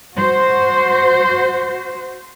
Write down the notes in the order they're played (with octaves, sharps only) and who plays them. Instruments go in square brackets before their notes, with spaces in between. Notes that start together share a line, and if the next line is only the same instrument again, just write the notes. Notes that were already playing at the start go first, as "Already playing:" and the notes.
[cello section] F#4 C5